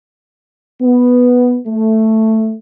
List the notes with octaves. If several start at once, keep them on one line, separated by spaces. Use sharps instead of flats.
B3
A3